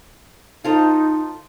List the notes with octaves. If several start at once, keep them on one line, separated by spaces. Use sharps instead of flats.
D#4 F4 A4 C5